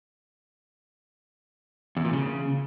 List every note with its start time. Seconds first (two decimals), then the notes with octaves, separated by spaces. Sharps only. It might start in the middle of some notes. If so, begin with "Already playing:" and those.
1.97 E2
2.05 A#2
2.13 C#3